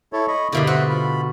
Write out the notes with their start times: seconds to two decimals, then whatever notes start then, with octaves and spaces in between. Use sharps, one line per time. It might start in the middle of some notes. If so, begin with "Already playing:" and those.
0.13 E4 A4 C#5
0.28 D#5 B5 C#6
0.52 G2 B2 D3 A#3 E4
0.67 F#4 C5 E5 F#5
0.89 F4 B5